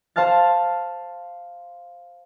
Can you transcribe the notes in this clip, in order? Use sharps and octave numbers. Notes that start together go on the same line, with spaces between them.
C5 F5 A5 F6 A6